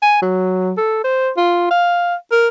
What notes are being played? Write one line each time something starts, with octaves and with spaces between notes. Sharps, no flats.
G#5
F#3
A4
C5
F4
F5
A#4